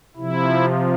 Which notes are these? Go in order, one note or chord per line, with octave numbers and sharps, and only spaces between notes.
C3 F3 E4